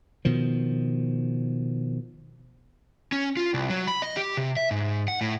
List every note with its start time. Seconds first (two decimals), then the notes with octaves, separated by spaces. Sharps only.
0.25 B2 D#3 F3
3.12 C#4
3.37 F4
3.54 C2
3.70 F#3
3.87 B5
4.02 D#5
4.17 G4
4.37 C3
4.57 E5
4.71 G#2
5.08 F#5
5.21 A2